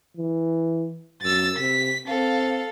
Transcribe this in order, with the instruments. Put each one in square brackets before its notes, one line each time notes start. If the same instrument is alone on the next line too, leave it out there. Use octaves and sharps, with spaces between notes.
[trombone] E3
[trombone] F#2 [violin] E6 A6
[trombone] C3 [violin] B6
[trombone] C4 [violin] A4 F5